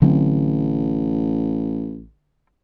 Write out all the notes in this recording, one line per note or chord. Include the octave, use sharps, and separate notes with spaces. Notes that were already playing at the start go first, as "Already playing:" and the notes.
A1 D3 F#3 C4